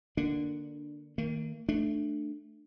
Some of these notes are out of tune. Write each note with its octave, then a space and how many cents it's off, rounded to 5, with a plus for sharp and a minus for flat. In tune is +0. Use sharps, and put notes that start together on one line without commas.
D3 +10 A#3 +0 D4 +0
D#3 +15 A#3 -45
A3 +0 D4 +15